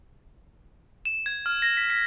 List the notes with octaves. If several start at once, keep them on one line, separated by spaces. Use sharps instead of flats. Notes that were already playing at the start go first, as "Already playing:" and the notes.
E7
G#6
F6
A#6
B6
B6